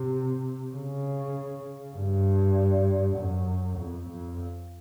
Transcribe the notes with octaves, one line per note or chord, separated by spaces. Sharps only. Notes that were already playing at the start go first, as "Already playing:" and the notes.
Already playing: C3
C#3
G2
F#2
F2
F2